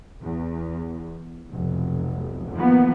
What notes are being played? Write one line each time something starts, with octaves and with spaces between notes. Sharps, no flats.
E2
F1 B1
E2 D#3 F3 A#3 B3